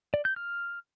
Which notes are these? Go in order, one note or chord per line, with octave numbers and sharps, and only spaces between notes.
D5
G6
F6